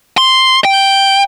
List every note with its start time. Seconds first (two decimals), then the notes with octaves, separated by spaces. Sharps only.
0.18 C6
0.65 G5